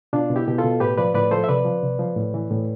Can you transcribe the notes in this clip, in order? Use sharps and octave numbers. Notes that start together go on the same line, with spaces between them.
B2 D4 F4
B2
E4 G4
B2 G4
F4 A4
B2
A2 G4 B4
F3 B4 D5
A2 B4 D5
F3 A4 C5
E5
C3 B4 D5
F3
C3
F3
A2
E3
A2